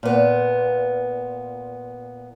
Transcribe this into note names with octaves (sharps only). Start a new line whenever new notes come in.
A#2 B3